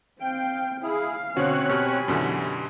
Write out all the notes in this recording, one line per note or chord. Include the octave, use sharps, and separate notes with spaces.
C4 F5 G5
E4 G#4 F5
B2 D3 C4 C#4 F#4 C#5 F#6
B2 G4 G#5 B5 F6
F#2 B2 D3 E3